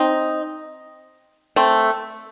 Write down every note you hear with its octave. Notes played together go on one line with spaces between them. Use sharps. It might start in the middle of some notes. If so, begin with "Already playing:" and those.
Already playing: C4 D#4
A3 C4